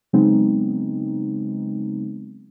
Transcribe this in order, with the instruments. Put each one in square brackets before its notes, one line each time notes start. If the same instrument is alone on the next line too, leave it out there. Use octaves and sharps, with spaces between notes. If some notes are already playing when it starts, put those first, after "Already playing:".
[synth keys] C#3 F#3 G#3 B3 C4 D#4